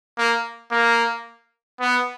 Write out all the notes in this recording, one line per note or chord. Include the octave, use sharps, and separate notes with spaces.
A#3
A#3
B3